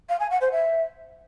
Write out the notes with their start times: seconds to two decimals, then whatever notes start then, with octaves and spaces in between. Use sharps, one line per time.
0.09 F5
0.20 G#5
0.30 F#5
0.41 C5
0.52 E5